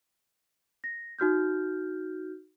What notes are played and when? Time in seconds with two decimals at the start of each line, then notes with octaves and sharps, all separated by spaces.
0.84 A#6
1.19 D#4 F#4 F6 G6